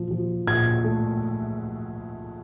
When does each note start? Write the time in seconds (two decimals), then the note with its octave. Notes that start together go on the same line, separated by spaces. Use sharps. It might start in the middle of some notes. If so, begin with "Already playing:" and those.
Already playing: A#2 F3
0.11 F3
0.47 A#2 G#6
0.84 A3